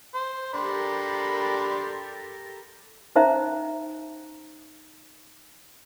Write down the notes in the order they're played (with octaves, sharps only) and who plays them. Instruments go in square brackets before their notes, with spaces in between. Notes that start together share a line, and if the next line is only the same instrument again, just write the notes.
[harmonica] C5
[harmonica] D4 B5 C6 [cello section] G4 A4 A#4
[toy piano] C#4 D#4 C5 E5 A#5